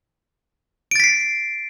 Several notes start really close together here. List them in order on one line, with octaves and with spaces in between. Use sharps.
D7 A6 B6 C7